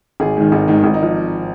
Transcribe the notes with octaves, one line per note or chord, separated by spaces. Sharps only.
G#1 G#4
G#2 D#3
G#1 D#4
G#2 D#3
G#1
D#4
F3